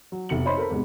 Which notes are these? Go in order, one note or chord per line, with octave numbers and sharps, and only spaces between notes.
F#3
F1 B2 C#7 F#7
C5 C#5 D#5 B5 C6
A4 A#4 C5 B5
E2 G#2 C3 G#3